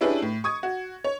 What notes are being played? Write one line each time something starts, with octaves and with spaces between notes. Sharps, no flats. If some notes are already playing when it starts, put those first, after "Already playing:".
C#4 D4 E4 G4 G#4 B4
A2
C#6 D#6 G#6
F#4
C#5